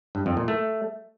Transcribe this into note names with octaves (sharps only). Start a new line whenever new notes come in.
G2
F2
A#2
A3